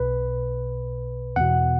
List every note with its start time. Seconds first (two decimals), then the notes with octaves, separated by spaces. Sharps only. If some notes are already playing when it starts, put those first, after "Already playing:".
Already playing: B1 B2 B4
1.36 E2 B2 F#5